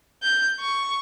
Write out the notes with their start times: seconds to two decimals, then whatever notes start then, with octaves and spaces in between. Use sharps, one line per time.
0.23 G6
0.59 C#6